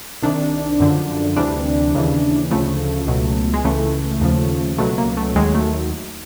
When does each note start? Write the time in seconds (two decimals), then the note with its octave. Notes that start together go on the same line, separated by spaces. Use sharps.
0.23 C2 C3 D#3 D4
0.80 F#2 D3 F3
1.36 D2 C3 E3 G3 D4
1.94 D#2 C#3 E3
2.51 D2 C#3 F3 A3
3.07 C#2 B2 F#3
3.54 G#3
3.64 C#2 C#3 E3 A3
4.21 D#2 C#3 F3
4.78 C#2 B2 F#3 A3
4.98 A#3
5.17 A3
5.35 D#2 D#3 F#3 G#3
5.55 A3